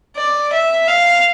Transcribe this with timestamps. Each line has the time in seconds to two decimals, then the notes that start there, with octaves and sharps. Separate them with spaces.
0.16 D5
0.52 E5
0.87 F5